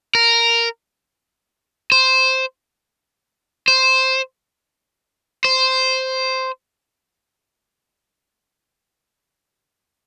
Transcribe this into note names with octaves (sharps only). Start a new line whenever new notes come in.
A#4
C5
C5
C5